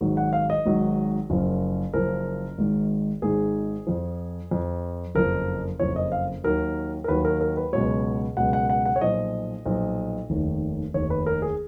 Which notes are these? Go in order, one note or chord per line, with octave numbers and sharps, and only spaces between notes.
G#1 G#2 D#3 F#3
F#5
F5
D#5
G#1 G#2 D#3 F#3
F#1 F#2 F3
F#1 F#2 F3 A#4
G#1 G#2 D#3
G#1 G#2 D#3 G#4
F2 F3
F2 F3
F#1 F2 F3 A#4
F#1 F2 F3 C#5
D#5
F5
D#2 D#3 F#3 A#4
A#4
D#2 D#3 F#3 B4
A#4
A#4
B4
C#2 B2 F#3 C#5
C#2 B2 F#3 F#5
F#5
F#5
F#5
C#5
B1 A#2 F3 D#5
B1 A#2 F3
F1 D#2 D#3
F1 D#2 D#3 C#5
B4
A#4
G#4